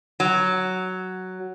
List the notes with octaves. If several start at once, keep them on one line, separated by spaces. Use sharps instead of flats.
F#3